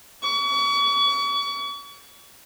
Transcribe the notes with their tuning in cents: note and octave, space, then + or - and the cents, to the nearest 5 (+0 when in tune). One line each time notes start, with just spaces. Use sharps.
C#6 +40